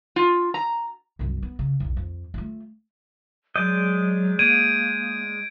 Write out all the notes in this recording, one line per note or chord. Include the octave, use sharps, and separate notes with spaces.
F4
A#5
C2 F#2
B3
C#3
B1 E2
F2
A3 F4
F#3 G#3 D5 D#5 G6
A#3 G#6 D7 D#7